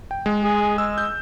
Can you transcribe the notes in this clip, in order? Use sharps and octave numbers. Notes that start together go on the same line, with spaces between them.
G5
G#3
G#4
G#3 E6
G6